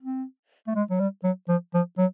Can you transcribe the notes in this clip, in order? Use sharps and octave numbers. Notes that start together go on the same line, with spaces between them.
C4
A3
G#3
F#3
G3
F#3
F3
F3
F#3